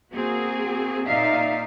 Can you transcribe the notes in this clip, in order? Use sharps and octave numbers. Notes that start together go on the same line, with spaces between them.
A#3 C4 F#4 G#4
A#2 D#4 D5 E5 F5